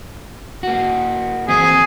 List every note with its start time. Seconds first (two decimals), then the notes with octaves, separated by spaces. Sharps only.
0.63 A#3 F#4
1.48 E3 C4 E4 G#4